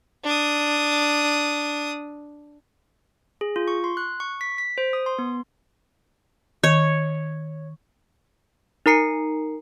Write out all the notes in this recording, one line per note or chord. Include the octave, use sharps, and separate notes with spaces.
D4 D#6
G#4
F4
C#6
C6
F#6
C#6
B6
B6
C5
D#6
C6
B3
D#3 C#5
D#4 A#4 A#5 C7 C#7